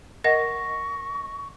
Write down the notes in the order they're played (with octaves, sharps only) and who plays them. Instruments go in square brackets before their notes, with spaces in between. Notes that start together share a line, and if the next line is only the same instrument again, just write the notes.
[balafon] A#4 D#5 F#5 [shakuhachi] C#6 [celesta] A#6